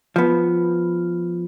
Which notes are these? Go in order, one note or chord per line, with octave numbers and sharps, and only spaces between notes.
F3 B3